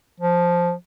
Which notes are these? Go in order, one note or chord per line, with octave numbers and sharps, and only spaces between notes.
F3